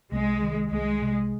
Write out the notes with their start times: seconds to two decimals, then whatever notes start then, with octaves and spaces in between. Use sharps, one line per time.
0.12 C2 G#3
0.41 D#3
0.71 C2 G#3
1.02 C3